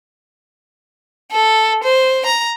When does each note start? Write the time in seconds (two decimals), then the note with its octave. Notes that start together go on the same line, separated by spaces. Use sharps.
1.31 A4
1.84 C5
2.26 A#5